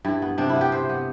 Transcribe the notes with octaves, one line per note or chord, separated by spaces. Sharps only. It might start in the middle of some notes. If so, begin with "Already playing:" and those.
G2 E4
B3
C3 D4
E4
B3
G4
C3 C5
B3